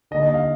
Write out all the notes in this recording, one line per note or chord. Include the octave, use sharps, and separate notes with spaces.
D#2 D3 D#5
D#5
F5